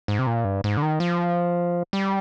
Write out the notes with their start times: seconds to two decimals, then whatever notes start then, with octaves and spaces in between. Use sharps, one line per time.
0.08 G#2
0.19 C3
0.27 A#2
0.45 G2
0.64 G#2
0.77 D3
0.83 D#3
1.00 F3
1.93 G3